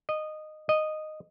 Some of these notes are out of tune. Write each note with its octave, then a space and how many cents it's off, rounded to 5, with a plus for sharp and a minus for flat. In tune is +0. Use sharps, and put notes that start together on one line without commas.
D#5 -15
D#5 -10